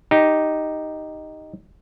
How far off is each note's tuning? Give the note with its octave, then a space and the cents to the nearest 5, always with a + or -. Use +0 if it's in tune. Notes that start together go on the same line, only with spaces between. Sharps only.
D#4 +0 G4 +0